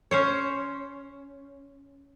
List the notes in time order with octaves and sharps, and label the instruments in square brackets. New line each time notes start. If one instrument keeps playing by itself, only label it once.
[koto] C#4 C5 C#5